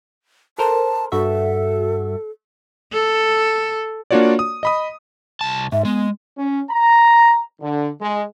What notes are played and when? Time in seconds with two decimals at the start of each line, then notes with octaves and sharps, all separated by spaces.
0.58 A4 A#4 C5 A5
1.12 G2 F#4 A4 E5
2.92 A4
4.11 A#3 D4 F4 F#4 C#5 D5
4.39 D#6
4.63 D#5 B5 D#6
5.41 C2 A5
5.72 G#2 E5
5.85 G#3 B3
6.37 C#4
6.70 A#5
7.61 D3
8.01 G#3